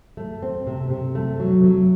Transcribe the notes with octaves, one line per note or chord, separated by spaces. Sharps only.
A3
C4
C3
C3
A3
F#3
F#3